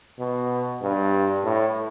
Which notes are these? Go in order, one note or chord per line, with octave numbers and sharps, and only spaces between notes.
B2
G2
A2